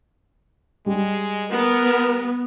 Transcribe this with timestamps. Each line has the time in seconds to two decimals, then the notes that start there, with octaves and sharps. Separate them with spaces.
0.86 G3 G#3
1.50 B3 A#4